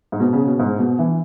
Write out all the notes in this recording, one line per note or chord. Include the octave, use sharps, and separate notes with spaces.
G#2
B2
C#3
B2
G#2
B2
E3